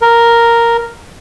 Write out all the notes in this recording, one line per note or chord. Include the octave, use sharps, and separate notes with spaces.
A#4